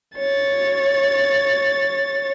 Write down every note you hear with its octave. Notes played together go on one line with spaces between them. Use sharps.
C#5 A6